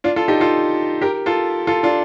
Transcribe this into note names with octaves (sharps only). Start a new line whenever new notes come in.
D4 F4
F4 A4
D#4 G4
F4 A4
G4 A#4
F4 A4
F4 A4
D4 F4